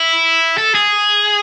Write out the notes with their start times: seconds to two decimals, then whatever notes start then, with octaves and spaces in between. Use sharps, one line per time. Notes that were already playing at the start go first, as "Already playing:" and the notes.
Already playing: E4
0.58 A4
0.75 G#4